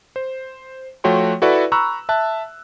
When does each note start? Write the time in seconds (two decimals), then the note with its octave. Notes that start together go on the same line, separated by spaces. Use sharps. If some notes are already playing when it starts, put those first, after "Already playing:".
0.16 C5
1.04 F3 A3 F#4 C#5 G5 C6
1.42 E4 F#4 A4 B4 D5
1.72 A#5 B5 C#6 E6 F#6
2.09 E5 A5 F#6